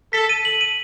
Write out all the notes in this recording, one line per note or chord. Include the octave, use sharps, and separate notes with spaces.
A4 B6
D#7
F#7
D#7